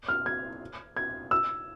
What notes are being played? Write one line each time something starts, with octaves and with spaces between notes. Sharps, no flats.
F6
G#6
G#6
E6